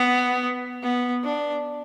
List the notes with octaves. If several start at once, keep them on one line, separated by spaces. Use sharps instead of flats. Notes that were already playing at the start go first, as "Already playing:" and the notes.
Already playing: B3
B3
D4